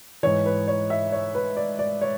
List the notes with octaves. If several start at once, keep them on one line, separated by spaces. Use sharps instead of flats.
G#2 E3 C#5
B4
C#5
E5
C#5
B4
D5
D5
C#5